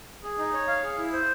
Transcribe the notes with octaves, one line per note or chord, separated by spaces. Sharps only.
G#4
D#4
C#5
F5
G#4
E4
C5